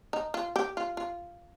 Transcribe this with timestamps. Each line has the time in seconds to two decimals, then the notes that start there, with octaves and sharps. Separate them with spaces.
0.13 D#4
0.34 F4
0.56 G4
0.77 F4
0.97 F4